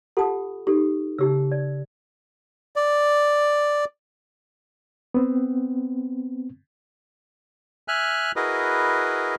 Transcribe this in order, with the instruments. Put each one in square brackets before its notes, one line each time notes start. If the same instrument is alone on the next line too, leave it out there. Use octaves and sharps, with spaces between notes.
[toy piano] F4 G4 A4 [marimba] F#5 A5 D#6
[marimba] D#4 [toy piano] G4 A4
[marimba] C#3 [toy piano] D#4 G4 E6
[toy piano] D5
[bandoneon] D5
[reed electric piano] B3 C4
[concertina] E5 G#5 F6 F#6
E4 F#4 G#4 A#4 B4 D#5